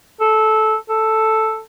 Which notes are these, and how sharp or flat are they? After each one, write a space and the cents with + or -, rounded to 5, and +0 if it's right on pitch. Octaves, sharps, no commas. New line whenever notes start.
A4 -15
A4 +0